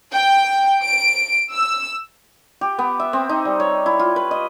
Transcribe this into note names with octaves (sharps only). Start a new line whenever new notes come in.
G5
D7
E6
G4
B3
E5
C4
D#4
G3
C#5
E4
F4
B4
D#5